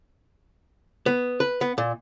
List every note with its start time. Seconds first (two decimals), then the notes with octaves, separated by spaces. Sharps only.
1.06 B3
1.40 B4
1.61 B3
1.78 A#2